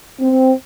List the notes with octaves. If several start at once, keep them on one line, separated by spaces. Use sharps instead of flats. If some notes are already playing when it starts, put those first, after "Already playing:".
C4